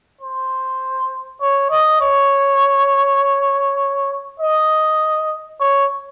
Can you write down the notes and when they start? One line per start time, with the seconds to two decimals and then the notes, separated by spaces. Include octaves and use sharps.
0.21 C5
1.41 C#5
1.71 D#5
2.01 C#5
4.40 D#5
5.60 C#5